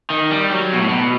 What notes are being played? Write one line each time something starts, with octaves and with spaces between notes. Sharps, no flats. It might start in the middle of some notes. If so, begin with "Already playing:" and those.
D#3
G3
F#3
B2
A2
B2